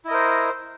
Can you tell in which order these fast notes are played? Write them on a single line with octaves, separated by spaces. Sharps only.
E4 D#5 A#4 C5